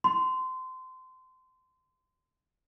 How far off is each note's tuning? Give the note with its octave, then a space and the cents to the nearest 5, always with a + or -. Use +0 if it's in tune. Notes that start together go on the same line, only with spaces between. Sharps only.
C6 -25